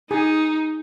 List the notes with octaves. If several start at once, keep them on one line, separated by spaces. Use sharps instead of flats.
D#4 G#4